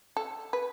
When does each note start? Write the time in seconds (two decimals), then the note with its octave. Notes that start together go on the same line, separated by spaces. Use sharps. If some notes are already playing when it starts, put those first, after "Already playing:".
0.17 A4
0.53 B4